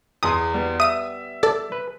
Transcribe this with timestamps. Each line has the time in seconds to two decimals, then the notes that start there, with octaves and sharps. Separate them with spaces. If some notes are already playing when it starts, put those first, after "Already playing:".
0.23 E2 G#4 C6 D#6
0.54 G3 B3
0.80 E5 D#6 D#7
1.43 A4 D5
1.72 B4